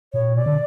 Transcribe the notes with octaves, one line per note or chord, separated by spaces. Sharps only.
A#2 C#5
B2 D5
D3